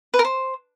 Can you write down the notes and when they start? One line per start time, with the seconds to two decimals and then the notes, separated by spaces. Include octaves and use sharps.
0.14 B4
0.19 A#4
0.25 C5